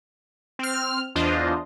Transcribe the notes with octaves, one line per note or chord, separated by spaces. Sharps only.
C4 F6
E2 D4 F4 C5 D#5